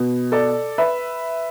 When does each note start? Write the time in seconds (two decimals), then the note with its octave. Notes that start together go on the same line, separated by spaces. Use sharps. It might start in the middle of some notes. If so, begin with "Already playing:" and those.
Already playing: B2 B3
0.32 A4 D5
0.78 B4 E5